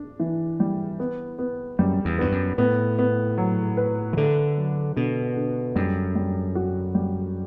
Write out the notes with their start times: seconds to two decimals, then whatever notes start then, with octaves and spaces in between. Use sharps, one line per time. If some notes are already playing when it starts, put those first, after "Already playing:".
Already playing: D4
0.20 E3
0.60 G3
0.99 B3
1.39 B3
1.79 F#2 G3
2.05 E2
2.18 G2 B3
2.32 F#2
2.58 A2 B3
2.99 B3
3.38 F#3
3.77 B4
4.13 E3
4.17 D3 A3
4.57 F#3
4.96 B2 D3
5.36 D3
5.76 F#2 G3
6.15 G3
6.55 F#4
6.95 G3